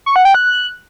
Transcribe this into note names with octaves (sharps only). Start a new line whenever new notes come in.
C#6
F#5
G5
F#6